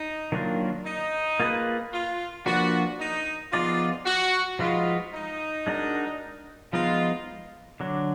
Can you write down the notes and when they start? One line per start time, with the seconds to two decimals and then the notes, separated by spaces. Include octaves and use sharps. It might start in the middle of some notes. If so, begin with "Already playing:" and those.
Already playing: D#4
0.32 D#3 F#3 A#3 D4 F4
0.85 D#4
1.40 A#3 F4 G#4 B4
1.93 F4
2.46 F3 A#3 D4 F4 F#4 B4
3.00 D#4
3.53 F3 B3 D#4 F4 G#4 D5
4.06 F#4
4.59 F3 G#3 D#4 F4 F#4 B4
5.14 D#4
5.67 G#3 D4 F#4 A#4
6.73 F3 G#3 B3 D#4 F4
7.80 D3 F#3 D4